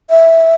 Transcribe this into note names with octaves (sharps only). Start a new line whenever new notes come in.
E5